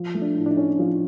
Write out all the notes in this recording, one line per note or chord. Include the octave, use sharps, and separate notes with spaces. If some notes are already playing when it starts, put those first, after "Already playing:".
Already playing: F3
A3
D4
A2
D4
D#4
C#4
F3